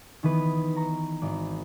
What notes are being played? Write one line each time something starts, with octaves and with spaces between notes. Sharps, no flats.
D#3 E3 B3 B4
A#5 C#6
G#1 D5